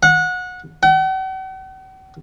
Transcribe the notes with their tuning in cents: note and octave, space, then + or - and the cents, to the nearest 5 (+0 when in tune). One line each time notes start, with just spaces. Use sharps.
F#5 -25
F#5 +45